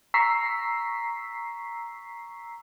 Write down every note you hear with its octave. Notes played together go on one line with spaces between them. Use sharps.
A#5 C#6 E6 B6 C7